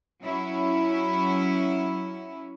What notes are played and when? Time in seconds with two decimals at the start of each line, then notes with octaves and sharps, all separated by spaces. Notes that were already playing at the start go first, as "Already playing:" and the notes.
0.21 F#3 C#4 E4